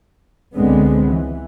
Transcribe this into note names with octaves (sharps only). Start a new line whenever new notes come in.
C#2 D3 G#3 B3 C4
E3